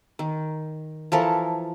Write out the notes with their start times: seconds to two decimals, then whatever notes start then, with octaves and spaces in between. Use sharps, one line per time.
0.19 D#3
1.12 E3 F3 A4 A#4